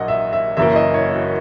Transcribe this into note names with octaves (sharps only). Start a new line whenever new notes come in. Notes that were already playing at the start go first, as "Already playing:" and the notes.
Already playing: A#1 A#2 F#3 A#3 D#5 F#5
E5
E5
F#1 F#2 E3 A#3 E5
D#5
C#5
F#4